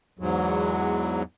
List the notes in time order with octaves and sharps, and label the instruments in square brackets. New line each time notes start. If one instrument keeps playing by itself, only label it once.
[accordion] E2 G#2 F#3